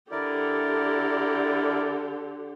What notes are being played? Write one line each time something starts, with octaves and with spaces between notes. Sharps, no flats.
D3 E4 G4 A#4 D5